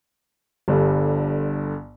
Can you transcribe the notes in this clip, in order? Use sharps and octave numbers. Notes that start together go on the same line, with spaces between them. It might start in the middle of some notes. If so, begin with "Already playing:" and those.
G1 G2 D3